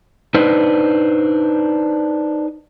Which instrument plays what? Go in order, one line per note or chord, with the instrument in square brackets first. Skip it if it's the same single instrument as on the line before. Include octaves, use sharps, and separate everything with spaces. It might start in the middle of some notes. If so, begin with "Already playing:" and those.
[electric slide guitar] D4 D#4 B4 C5